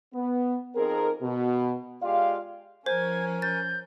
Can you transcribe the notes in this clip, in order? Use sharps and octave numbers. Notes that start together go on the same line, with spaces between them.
B3
F2 C4 D#4 G#4 A#4
B2
G#3 F4 G4 D5 F5
F3 C#4 A#4 C5 G#5 G#6
G6 A6